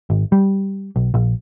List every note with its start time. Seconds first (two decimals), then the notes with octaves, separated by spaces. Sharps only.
0.10 G#1
0.32 G3
0.96 B1
1.14 A#1